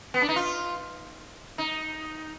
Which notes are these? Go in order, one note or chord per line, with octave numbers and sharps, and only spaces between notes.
B3
D4
D#4
F4
D#4